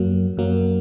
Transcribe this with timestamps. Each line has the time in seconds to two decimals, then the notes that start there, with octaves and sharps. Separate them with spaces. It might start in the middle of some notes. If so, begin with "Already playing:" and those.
Already playing: F#2 F#3 A#3
0.37 F#2 F#3 A#3